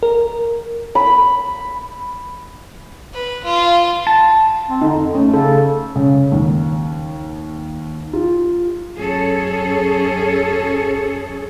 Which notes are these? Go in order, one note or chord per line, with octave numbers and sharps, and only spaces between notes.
A#4
B5
B4
F4
A5
C4
D3 D#4
F2
A3 C#4
C#3 A4
C#3
D#2
F4
F#2 C#4 G#4 A4 C#5